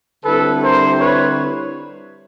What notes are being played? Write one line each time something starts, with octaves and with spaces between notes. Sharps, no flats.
D3 G3 C4 E4 A4 B4
A#4 C5
B4 C#5